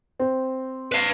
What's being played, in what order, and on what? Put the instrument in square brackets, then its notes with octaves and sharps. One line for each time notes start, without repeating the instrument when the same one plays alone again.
[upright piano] C4
[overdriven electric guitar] B4 F5